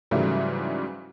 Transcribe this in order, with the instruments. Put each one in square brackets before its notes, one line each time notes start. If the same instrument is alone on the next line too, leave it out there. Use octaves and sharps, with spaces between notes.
[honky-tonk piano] G#2 C#3 E3 F#3 G3 A3